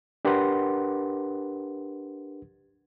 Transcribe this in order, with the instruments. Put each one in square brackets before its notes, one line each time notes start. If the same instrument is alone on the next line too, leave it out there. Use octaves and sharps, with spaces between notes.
[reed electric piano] D4 G4 A#4 B4 F#5 C6